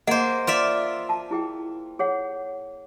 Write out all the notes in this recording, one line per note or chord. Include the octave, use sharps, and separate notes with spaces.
A#3 G#4 C5 D#5 F#5
F4 D5 E5
A5
E4 G#4 G5
G#4 C#5 F#5